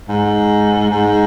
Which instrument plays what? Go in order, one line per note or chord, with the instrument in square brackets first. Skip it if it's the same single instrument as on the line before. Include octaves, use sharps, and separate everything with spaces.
[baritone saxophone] G#2
G#2